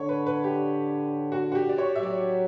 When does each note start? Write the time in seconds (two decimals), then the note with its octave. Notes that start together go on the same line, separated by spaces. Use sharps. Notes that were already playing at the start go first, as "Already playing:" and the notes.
Already playing: D3 C#5
0.09 B4
0.26 B4
0.44 G4
1.32 F#4
1.52 F#4
1.55 G4
1.69 D5
1.78 C#5
1.96 E5
2.02 F#3 D5